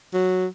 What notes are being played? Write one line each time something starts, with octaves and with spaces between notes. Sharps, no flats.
F#3